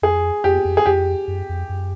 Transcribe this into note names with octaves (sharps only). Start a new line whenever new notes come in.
F2 G#4
F2 G4
F2
G#4
F2 G4
F#2
F2
F#2